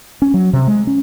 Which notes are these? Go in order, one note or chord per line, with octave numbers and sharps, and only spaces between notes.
C#4
F#3
C3
G#3
C#4